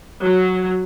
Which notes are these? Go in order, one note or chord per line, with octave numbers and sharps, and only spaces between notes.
F#3